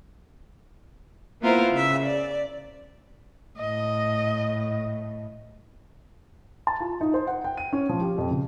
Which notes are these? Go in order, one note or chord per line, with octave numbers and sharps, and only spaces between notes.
A#3 B3 E4 F4 A#4 C5
C#3 E5
D5
A2 D#5
A5
F4
D#4
C5
F#5
G5
D#7
C#4
F3
G4
F2
C#3